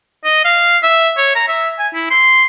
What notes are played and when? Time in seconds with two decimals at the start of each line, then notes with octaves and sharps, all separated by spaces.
0.25 D#5
0.45 F5
0.83 E5
1.18 C#5
1.35 A#5
1.48 E5
1.79 G#5
1.94 E4
2.11 C6